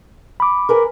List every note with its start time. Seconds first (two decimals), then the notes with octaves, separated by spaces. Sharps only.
0.40 B5 D6
0.69 A#4 B4 G#5